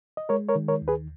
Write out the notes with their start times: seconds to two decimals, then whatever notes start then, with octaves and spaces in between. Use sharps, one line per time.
0.17 D#5
0.29 G#3 A#4 C#5
0.49 A#4 C#5
0.55 D#3
0.68 A#4 C#5
0.82 D#2
0.88 G#4 B4